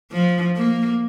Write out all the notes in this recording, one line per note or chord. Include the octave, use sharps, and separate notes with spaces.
F3
A#3